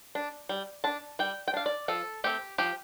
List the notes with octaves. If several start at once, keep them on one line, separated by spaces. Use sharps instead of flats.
D4
G3
D4 A5
G3 G5
G5
D4 F5
D5
F3 A4
A3 C4 G4
F3 G4